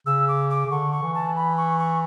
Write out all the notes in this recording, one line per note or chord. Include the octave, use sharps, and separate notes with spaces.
C#3 E6
D6
D6
C#3
D3 C#6
C#6
E3
A5
B5
C#6
C#6